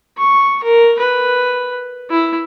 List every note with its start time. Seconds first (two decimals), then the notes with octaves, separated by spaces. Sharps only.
0.17 C#6
0.63 A#4
0.99 B4
2.10 E4